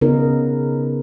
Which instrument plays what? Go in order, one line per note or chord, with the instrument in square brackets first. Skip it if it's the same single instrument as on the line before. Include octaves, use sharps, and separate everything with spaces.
[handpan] C#3 B3 D#4 A#4